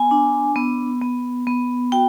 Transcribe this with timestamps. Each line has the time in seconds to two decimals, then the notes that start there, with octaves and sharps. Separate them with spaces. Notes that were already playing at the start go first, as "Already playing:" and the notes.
Already playing: B3 G#5
0.11 D4
0.56 B3
1.02 B3
1.47 B3
1.92 F#4 G5